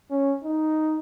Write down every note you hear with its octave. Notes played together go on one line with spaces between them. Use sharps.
C#4
D#4